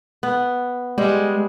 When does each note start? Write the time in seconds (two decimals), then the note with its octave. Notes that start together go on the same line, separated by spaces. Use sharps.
0.23 B3
0.98 G3 G#3